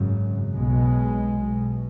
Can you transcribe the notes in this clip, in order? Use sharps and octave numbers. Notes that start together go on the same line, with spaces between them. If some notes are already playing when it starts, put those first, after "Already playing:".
Already playing: G#1 F#2 C#3
B1 B2 G#3
B1 B2